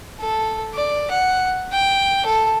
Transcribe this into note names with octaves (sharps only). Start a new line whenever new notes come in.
A4
D5
F#5
G5
A4